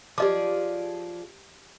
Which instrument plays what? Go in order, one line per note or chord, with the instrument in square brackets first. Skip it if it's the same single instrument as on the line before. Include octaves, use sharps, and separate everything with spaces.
[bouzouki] F3 G#4 D5 [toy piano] G4 D#5 D6